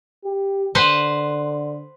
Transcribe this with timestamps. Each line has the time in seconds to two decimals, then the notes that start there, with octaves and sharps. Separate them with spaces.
0.25 G4
0.75 D3 B4 C5 F#5